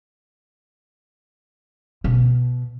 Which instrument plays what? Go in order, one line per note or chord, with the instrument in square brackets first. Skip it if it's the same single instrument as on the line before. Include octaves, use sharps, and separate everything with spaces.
[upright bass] B2